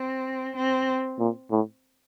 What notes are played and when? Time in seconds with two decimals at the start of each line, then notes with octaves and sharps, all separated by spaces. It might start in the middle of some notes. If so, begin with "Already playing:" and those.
Already playing: C4
0.56 C4
1.19 A#2
1.51 A2